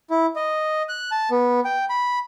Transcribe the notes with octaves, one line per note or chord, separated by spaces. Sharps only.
E4
D#5
F#6
A5
B3
G5
B5